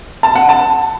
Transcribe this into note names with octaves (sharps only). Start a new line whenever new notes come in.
A5
F#5
A5